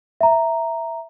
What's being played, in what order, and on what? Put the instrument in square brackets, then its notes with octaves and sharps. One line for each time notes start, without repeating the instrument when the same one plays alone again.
[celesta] E5 A#5